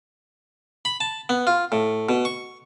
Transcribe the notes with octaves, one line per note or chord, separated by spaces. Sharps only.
B5
A5
B3
F4
A2
B2
C#6